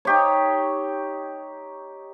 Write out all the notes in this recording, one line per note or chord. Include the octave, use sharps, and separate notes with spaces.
D#4 G4 C#5